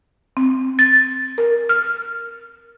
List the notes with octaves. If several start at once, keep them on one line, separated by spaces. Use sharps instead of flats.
C4
A6
A#4
F6